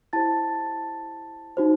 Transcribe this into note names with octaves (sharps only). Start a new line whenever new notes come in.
E4 G4 C5 A5 A6
D#4 F#4 C5